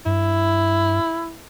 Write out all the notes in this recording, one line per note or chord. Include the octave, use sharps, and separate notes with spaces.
G2 E4